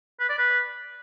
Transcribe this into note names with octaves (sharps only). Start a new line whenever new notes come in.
B4
D5
B4